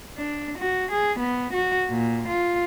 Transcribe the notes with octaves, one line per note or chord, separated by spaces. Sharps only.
D4
F#4
G#4
B3
F#4
A#2
F4